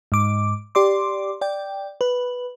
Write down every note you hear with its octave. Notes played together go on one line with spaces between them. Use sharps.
G#2 D6
G4 D5 C6 D6
D5 G5
B4